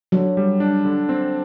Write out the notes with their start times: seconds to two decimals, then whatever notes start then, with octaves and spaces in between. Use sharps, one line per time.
0.12 D3 F#3
0.37 G3
0.60 D4
0.85 D3
1.09 C4